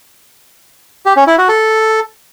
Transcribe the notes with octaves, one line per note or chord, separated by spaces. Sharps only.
G4
C#4
E4
F#4
A4